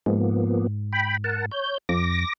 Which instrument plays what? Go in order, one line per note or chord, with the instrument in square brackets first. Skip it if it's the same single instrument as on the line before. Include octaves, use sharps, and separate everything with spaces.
[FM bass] G#2 [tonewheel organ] F3 A#3 B3
[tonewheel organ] G5 B5
A#4 F#5 A5
C#5 G6
[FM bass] F2 [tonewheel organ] D6 A#6